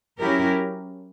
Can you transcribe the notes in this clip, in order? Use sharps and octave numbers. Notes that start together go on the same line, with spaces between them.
F#3 C#4 E4 G4 A#4